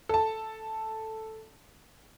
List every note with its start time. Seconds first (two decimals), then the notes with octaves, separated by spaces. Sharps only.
0.09 A4 A5